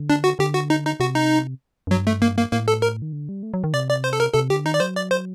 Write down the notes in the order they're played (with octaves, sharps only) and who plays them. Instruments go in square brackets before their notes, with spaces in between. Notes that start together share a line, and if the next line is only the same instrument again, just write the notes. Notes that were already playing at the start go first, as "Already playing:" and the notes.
Already playing: [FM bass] D3
[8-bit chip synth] D4
F#4
[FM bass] D3 [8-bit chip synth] G4
[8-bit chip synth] F#4
D#4
D#4
[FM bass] C3 [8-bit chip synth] F#4
[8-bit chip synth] D#4
[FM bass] F#2
[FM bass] G2 [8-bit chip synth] F#3
[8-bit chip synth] A3
A#3
A#3
[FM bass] A2 [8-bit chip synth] A#3
[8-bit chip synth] A4
A#4
[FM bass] D#3
D3
G3
A3
F#3
D#3
[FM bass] C3 [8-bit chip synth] D5
[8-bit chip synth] D5
C5
A4
A#4
[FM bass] C3 [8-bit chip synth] A4
[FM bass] D3 [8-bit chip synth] G4
[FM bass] D#3 [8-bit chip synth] D#4
[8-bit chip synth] D5
[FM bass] F#3 [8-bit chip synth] C5
[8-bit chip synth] D5
C5